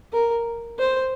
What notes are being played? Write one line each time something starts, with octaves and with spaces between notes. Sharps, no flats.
A#4
C5